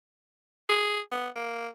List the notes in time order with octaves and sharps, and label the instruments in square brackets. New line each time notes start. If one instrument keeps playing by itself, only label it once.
[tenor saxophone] G#4
B3
A#3